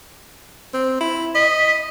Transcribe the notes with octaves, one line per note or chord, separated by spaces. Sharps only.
C4
E4
D#5 B6